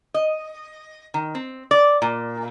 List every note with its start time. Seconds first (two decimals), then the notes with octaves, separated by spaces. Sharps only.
0.14 D#5
1.14 D#3
1.35 C4
1.71 D5
2.02 A#2